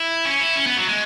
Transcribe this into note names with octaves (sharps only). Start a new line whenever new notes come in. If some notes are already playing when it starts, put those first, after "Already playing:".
Already playing: E4
C#4
E4
C#4
B3
F#3
G#3